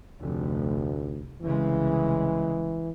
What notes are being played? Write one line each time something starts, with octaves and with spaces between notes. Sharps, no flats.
F1 D2
C2 C#3 E3 G#3